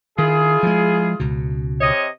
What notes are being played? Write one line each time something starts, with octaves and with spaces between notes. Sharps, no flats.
D#3 E4 F4 G#4
F3 G#3
C#2 B2
C3 C#5 D#5